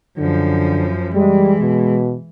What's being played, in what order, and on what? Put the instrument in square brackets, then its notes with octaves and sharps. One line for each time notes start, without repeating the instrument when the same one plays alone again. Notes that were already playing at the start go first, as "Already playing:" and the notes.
[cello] F#2 F3 [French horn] D3
[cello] E3 [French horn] G3 [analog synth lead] G#3
[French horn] B2